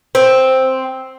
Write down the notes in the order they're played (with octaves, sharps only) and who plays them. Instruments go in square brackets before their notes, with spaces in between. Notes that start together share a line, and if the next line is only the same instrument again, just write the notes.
[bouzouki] C4